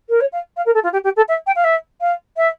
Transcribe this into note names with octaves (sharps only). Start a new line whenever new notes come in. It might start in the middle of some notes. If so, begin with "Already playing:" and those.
A#4
C#5
F5
F5
A#4
A4
F4
G4
G4
A4
E5
G5
F5
E5
F5
E5